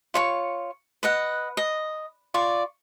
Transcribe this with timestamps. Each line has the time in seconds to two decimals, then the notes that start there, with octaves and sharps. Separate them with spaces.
0.14 F4 C#5 C#6
1.03 B4 D#5 F#5
1.57 D#5
2.34 F4 D5 C#6